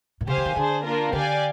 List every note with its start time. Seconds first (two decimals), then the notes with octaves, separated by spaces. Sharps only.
0.21 A#2
0.27 C3 G4 C5 F5 G#5
0.37 D3
0.46 D#3
0.56 D3 D4 G#4 C5
0.85 A#3 D4 F4 A#4
1.13 D3 G4 D5 F5 G#5